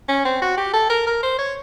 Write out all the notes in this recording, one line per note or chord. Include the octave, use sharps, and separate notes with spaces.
C#4
C4
F#4
G4
A4
A#4
A#4
C5
C#5